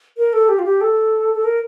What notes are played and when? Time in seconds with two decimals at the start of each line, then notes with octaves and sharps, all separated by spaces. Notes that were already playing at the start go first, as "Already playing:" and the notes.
0.17 A#4
0.33 A4
0.49 G4
0.59 F4
0.64 G4
0.81 A4
1.34 A4
1.44 A#4